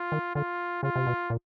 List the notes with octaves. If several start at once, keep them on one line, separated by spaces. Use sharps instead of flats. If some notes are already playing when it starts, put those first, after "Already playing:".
Already playing: F4
D#3
D3 F4
C#3 F4
C3
B2
A#2